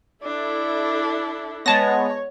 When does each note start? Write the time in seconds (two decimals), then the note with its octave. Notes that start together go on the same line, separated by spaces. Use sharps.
0.23 D4 E4 A4
1.66 G#3 B3 C#5 A5 A#6